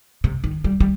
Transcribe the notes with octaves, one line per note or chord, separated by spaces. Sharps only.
C3
D#3
G3
G3